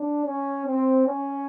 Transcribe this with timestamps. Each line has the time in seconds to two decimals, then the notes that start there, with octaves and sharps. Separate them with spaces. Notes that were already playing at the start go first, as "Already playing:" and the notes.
Already playing: D4
0.25 C#4
0.65 C4
1.06 C#4